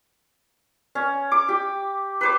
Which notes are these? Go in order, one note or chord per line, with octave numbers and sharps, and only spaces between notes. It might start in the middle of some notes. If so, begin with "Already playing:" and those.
C#4
D6
G4
B4 C5 D6